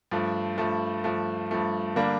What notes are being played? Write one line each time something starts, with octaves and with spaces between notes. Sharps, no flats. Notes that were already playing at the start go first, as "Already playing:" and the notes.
G2 F3 A3
G2 F3 A3
G2 F3 A3
G2 F3 A3
D3 G3 A#3 D4